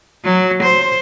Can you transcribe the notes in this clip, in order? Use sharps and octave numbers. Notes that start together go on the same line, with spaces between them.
F#3
C5